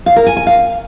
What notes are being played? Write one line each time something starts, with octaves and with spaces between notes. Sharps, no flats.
F5
A#4
G#5
G#5
F5